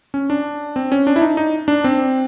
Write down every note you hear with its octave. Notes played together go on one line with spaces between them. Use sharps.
C#4
D4
C4
C#4
D4
E4
D#4
D#4
D4
C4